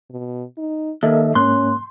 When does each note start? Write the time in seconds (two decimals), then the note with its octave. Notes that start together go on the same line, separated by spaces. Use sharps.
0.10 B2
0.58 D#4
1.03 D#2 A#3 A4 D#5 E5
1.35 G#2 A#3 C#4 C6 F#6